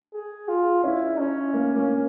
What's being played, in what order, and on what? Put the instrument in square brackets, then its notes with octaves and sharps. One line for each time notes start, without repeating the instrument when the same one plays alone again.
[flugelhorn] G#4
F4
[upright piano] C#4 [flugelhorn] E4
[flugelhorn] C#4
[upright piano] A#3
A#3